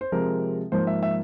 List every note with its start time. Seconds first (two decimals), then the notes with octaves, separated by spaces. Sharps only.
0.01 C5
0.12 C3 F3 G#3 A#4
0.72 G#2 F3 A#3 C5
0.87 E5
1.03 E5